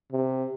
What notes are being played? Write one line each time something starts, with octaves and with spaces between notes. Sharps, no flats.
C3